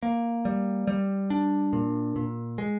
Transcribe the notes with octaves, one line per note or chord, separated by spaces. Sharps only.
A#3
G3
G3
D4
A#2
A#2
G#3